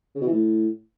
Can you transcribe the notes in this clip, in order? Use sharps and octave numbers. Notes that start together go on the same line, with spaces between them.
C#3
B2
E3
A2